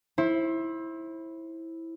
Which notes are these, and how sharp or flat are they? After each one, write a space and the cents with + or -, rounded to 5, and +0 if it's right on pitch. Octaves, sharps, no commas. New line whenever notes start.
E4 -5 C5 +30